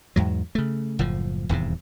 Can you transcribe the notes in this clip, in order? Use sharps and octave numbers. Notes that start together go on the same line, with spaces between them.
E2 G#2 F#3
C#3 A3
F#1 A2 F3
D#1 E2 G#2 C3